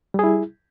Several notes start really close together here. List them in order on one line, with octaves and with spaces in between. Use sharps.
G3 G#4 E4